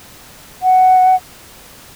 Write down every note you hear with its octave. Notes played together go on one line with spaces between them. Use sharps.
F#5